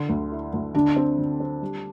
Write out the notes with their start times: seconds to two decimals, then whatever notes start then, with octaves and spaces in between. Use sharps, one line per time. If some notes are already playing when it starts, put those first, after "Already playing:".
Already playing: D3
0.09 D2
0.32 E4
0.53 D2
0.75 D3 D4
0.96 C4
1.18 D3
1.40 C4
1.62 G3